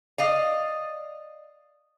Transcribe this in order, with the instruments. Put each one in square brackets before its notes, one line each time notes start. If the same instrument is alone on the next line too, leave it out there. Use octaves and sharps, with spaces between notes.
[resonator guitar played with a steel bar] D5 D#5 F5